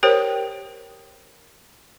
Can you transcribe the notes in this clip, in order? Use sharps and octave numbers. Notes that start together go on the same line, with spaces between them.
G4 A#4 C5 C#5 G5